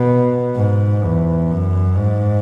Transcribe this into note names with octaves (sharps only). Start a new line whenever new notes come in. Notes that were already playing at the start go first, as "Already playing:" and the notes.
Already playing: B2
G#2
E2
F#2
G#2